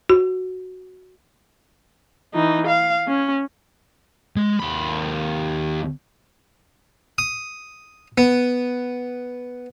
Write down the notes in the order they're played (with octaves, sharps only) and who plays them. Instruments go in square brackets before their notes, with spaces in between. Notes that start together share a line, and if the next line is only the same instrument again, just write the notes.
[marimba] F#4
[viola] E3 D#4
F5
C#4
[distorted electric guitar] G#3
D#2 B5
[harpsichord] D#6
B3